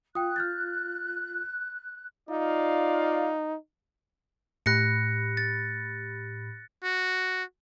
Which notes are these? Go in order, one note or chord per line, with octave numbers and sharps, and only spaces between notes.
F4 G5 D#6 F#6
F6 G6 A6
D#4 F4 D5 F5
A2 G4 B5 F#6 A#6 C#7
A6
F#4